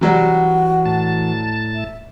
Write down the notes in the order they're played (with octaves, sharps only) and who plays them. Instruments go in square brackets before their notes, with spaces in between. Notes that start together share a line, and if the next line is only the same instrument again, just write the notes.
[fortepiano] C3 F#3 G3 [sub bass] E3 [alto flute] F#4
[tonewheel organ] A2 A5
[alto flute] E5